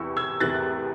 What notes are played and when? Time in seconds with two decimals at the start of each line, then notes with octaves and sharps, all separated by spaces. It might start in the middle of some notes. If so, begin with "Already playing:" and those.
Already playing: E2 C3 E3 C#6 E6
0.17 E6 G#6
0.40 E2 C3 E3 F#6 A6